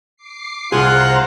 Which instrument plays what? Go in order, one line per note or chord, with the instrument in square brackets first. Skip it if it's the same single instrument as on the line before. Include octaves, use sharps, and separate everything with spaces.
[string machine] D6 C7
[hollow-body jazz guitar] C2 G#4 [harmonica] F4 [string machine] C5 A#5 [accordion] F#5 F#6